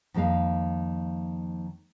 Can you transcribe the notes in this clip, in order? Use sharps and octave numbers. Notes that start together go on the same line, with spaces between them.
F2 D#3 G#3 A#3 F5